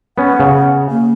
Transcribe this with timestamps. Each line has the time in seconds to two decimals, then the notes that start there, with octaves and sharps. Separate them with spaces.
0.18 B3 C#4 F#5
0.40 C#3
0.90 A#3